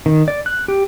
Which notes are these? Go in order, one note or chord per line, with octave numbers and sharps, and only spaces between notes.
D#3
D5
F#6
G4